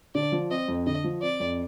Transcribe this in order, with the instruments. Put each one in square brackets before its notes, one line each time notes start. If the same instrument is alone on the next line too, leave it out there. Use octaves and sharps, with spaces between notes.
[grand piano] D3 [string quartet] D5
[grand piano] F3
[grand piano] C4 [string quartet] D#5
[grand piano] F2
[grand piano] D3 [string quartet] D#5
[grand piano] F3
[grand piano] C4 [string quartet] D5
[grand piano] F2